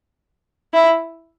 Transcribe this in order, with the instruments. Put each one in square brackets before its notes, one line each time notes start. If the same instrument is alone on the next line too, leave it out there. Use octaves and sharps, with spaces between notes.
[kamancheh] E4